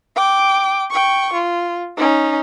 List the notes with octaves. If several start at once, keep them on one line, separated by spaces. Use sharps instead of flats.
G5 D6
G5 C#6
F4
C#4 D#4